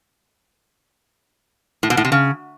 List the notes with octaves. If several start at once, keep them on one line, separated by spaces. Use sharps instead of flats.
A2
B2
A2
C3
C#3